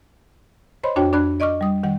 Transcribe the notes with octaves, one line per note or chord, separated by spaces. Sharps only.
C5 C#5 D#5 B5 C6
F2 D4 F#4 C#5 G5
F2 D4 D5 B5 F#6
D5 D#5 C#6 D6 F6
G3 D#6
D#3 G3 F#5